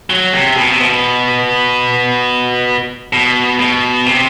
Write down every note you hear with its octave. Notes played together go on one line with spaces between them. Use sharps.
F#3
C3
B2
C3
B2
B2
B2
C3